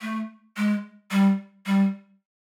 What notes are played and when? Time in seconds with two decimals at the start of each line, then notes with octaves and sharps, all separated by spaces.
0.01 A3
0.57 G#3
1.11 G3
1.66 G3